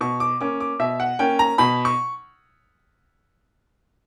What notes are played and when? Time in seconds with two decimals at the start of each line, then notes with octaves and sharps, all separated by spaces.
0.01 B2 C#6
0.20 D6
0.41 A#3 C#4 D6
0.60 D6
0.79 B2 E5
1.00 F#5
1.19 A#3 C#4 G5
1.39 A#5
1.58 B2 B5
1.85 C#6